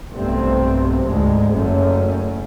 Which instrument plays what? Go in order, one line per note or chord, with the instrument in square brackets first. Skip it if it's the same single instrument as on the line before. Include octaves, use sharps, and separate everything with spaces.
[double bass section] B1 G2 C3 A3 C4
D2 G#2 G#3
F#1 F#2 A3 C#4